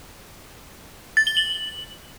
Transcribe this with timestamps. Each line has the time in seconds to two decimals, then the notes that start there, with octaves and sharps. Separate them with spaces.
1.17 A6
1.27 G7
1.37 F#7